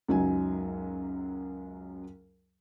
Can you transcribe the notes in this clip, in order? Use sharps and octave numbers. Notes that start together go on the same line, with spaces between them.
C#2 F#2 F#3 D#4 G#5